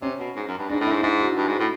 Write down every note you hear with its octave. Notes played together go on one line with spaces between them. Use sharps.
C3 C#4
B2
G#2
F#2
G2
G#2 D4
A2
G#2 E4
G#2 E4
F#4
G2
G#2
A2